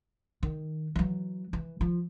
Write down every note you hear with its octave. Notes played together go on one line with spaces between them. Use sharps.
D#3
E3 F#3
E3
F3